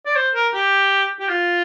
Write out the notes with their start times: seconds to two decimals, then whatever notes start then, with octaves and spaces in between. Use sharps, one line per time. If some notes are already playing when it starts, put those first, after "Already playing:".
0.06 D5
0.16 C5
0.34 A#4
0.53 G4
1.19 G4
1.28 F4